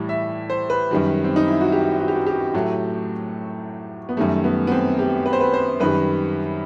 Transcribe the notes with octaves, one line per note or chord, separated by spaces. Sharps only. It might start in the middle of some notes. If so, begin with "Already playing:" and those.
Already playing: A2 E3 G3
E5
C5
B4
F#2 D#3 G3
C4
D#4
E4
F#4
G4
F#4
G4
F#4
G4
A2 F#3 A3
B3
F#2 D#3 G3 A3
B3
B3
C4
G4
B4
C5
B4
C5
F#2 D#3 G3 B4